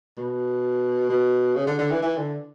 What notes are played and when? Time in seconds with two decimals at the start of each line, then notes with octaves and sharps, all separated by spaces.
0.17 B2
1.09 B2
1.56 C#3
1.67 D3
1.79 D3
1.90 E3
2.02 E3
2.17 D3